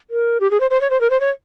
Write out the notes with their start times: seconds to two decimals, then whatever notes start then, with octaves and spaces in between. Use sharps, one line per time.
0.10 A#4
0.40 G4
0.51 G#4
0.60 C5
0.70 C5
0.81 C#5
0.90 C5
1.01 A#4
1.10 C5
1.20 C#5